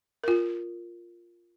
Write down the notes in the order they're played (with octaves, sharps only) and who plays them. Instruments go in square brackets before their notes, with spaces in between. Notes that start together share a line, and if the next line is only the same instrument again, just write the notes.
[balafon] F4 A#4